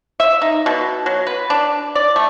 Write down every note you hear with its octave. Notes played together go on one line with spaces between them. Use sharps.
E5
D#4
B2
F#3
B4
D4
D5
A3